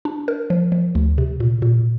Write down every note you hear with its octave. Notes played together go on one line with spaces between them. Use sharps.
D4
A#4
F3
F3
D2
C3
A#2
A#2